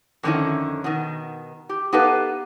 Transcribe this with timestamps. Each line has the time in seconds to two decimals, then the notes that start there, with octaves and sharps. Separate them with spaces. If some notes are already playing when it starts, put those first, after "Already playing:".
0.23 F2 D3 D#3 A#3 C#4 E4
0.84 B2 D#3
1.69 G4
1.93 B3 D#4 G4 A4 B4 F5